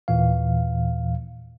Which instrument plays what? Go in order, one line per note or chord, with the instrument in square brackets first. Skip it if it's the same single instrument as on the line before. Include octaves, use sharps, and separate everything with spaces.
[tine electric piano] D#2 A#2 E3 F5